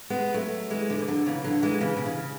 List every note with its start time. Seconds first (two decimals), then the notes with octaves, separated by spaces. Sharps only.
0.10 G#3 B3
0.34 F#3 A3
0.70 E3 G#3
0.90 D3
0.99 E3
1.08 D3 F#3
1.26 C#3 E3
1.44 D3 F#3
1.63 E3 G#3
1.81 C#3 E3
1.97 B2
2.06 C#3